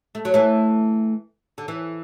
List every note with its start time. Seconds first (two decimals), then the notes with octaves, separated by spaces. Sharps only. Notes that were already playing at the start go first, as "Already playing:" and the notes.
0.15 A3
0.25 F#3
0.34 E3 A3
1.58 D3
1.68 E3